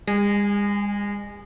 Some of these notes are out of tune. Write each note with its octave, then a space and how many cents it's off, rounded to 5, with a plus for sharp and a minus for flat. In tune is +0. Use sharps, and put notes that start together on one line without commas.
G#3 -40 G#5 +0